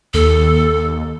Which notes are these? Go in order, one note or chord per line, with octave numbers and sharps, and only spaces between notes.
D#2 A4